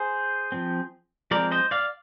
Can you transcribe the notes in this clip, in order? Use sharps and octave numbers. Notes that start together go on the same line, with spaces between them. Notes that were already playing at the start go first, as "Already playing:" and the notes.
Already playing: G#4 C5
F3 C4
F3 G#3 C4 A#4 D5
C5 D#5
D5 F5